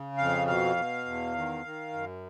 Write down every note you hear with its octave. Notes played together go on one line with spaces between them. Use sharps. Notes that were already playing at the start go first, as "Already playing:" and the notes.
Already playing: C#3
F2 F5
B2 F5
B2
E2
D#3
D#3
F#2